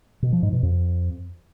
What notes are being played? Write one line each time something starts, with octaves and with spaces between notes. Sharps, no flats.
B2
F3
G#2
B2
F2